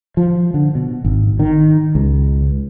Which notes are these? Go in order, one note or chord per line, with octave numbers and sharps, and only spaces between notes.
F3
D3
B2
G#1
D#3
C#2